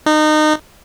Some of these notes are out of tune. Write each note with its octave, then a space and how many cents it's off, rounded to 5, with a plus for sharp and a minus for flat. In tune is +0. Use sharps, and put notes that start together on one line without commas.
D#4 -25